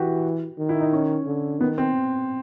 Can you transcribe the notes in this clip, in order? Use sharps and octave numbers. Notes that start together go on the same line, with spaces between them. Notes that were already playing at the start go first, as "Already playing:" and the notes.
Already playing: E3 F#4 G4
D#3
E4
D#4
C#4
D3
D#3 B3
C4